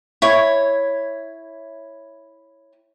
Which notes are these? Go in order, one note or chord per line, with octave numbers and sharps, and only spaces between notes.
E4 C#5